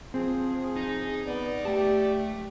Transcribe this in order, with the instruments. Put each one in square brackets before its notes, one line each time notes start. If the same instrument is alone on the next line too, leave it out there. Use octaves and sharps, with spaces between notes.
[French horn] F3 [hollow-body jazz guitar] C4 [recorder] G#4
[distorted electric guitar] D#4
[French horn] B3 [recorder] D5
[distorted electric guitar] A3 A5 [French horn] G4